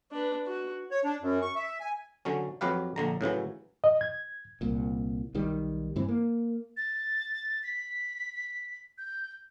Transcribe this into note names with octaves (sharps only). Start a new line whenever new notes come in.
D4 B4
F#4
C#5
D4
F#2
C#6
E5
G#5
D3 F#3 C#4
F2 F#3 G4 B4 F5
A#1 D3 A#5
A2 C#3 E3 F#3
D#5
G#6
C2 A#2
B1 D#3 G3
G2 E3 C4
A#3
A6
B6
G6